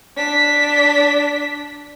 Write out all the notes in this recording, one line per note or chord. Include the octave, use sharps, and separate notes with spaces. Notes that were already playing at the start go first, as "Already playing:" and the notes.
D4 B6